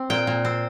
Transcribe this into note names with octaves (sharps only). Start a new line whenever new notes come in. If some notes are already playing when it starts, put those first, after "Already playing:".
Already playing: C4
A#2 G5
A#2
C4